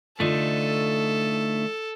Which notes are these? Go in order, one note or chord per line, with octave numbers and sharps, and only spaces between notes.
D3 A3 D#4 F4 A4